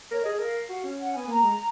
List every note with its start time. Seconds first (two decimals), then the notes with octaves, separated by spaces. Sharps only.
0.11 A#4 C#5
0.20 D#5
0.25 G#4
0.39 A#4 F5
0.69 F#4
0.84 C#4
0.99 F#5
1.13 B3 G#5
1.28 A#3 A#5
1.42 G#3